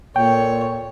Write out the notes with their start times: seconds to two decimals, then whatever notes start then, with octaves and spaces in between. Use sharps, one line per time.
0.16 A#2 A4 C#5 G5